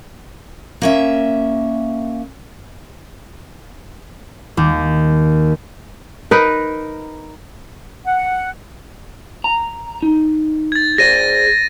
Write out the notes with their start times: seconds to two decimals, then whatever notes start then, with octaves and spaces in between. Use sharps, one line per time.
0.82 A#3 C#4 E5
4.57 D#2
6.31 D#4 A#4 B4
8.05 F#5
9.44 A#5
10.03 D#4
10.72 G#6 A6
10.98 G#4 C5 D5 A#6 D#7